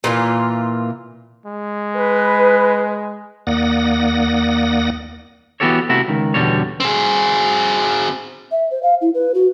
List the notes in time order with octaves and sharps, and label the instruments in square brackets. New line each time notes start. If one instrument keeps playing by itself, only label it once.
[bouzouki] A#2 E3 F4
[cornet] G#3
[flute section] B4
[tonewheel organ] D#2 A#3 D5 F#5 D#6 A#6
[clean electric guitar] E3 B3 F#4 G4 A4 C#5
C3 A3 E4 F#4
C#2 D#3
E2 B2 D3 G3 C#5
[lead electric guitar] C4 G#4
[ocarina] E5
C5
F5
E4
B4
F#4